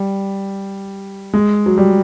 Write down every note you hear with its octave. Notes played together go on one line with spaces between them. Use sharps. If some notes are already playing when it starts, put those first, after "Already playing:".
Already playing: G3
G#3
F#3
G3